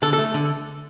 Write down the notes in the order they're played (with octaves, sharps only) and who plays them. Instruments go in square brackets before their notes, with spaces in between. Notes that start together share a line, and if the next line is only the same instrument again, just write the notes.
[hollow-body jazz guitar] D3 A4
A4
A3
D3